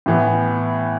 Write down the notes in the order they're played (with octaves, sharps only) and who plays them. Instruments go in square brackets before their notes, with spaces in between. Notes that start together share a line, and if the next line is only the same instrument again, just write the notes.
[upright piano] A2 E3 B3